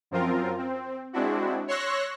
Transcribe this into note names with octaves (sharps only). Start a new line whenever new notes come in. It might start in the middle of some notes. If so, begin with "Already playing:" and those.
F#2 F3 C4 F4 A#4
C4
G#3 C4 D4 E4 F#4
C#5 C6 C#6 E6 F#6 A#6